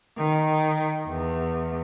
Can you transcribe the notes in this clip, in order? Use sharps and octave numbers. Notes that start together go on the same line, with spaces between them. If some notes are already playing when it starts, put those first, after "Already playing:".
D#3
E2